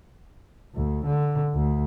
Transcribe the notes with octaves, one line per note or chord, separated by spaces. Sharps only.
D2
D3
D2